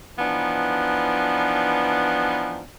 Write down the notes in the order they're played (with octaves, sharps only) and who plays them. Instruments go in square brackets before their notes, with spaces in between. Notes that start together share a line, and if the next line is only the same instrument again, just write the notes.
[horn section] E3 F3 B3 D4 D#4